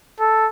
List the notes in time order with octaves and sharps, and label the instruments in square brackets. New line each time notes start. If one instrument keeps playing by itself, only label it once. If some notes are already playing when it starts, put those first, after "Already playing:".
[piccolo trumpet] A4